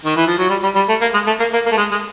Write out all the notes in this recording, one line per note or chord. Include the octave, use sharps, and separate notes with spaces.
D#3
E3
F3
F#3
G3
G3
G3
A3
A#3
G#3
A3
A#3
A#3
A#3
A3
G#3
G#3